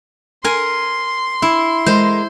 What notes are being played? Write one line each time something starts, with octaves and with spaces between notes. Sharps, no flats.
A#4 G#5 C6
E4
G#3 A#4 C5